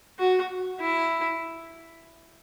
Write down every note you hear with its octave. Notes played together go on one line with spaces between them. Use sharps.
F#4
E4